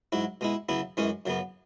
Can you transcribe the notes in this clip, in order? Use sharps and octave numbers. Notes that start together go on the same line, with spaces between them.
G#2 F#3 E4
B2 G#3 E4
C#3 F#3 B3 E4
F#2 E3 G#3 C#4
F#2 C#3 F#3 B3